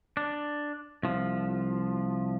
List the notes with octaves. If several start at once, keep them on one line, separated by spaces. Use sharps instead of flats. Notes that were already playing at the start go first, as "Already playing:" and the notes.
D4
C2 F3